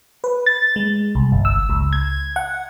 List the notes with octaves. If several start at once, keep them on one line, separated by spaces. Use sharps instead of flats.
B4
A6
G#3
C2
G1
E6
C#2
G#6
F#5